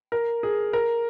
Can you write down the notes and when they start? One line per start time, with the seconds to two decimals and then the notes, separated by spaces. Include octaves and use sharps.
0.12 A#4
0.43 G#4
0.73 A#4